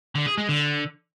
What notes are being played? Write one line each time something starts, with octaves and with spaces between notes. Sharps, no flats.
D3
G#4
G#3
D3